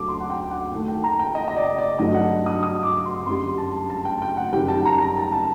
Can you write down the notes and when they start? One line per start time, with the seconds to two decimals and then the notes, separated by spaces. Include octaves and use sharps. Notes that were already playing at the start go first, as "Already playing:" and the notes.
Already playing: D2 D3 F#3 A3 D6
0.08 C6
0.20 F#5
0.30 G5
0.51 F#5
0.72 D#2 D#3 A3
0.88 G5
1.04 A#5
1.19 G5
1.35 D#5
1.48 D#5
1.56 D5
1.78 D5
1.99 G2 D3 F#3 A3 D#5
2.14 F#5
2.46 D#6
2.63 D#6
2.83 D6
3.05 C6
3.26 F#2 D3 G3 C6
3.58 A5
3.90 A5
4.05 G5
4.22 G5
4.37 F#5
4.53 F#2 D#3 G3 G5
4.68 A5
4.85 A#5
5.01 A#5
5.17 A5
5.32 A5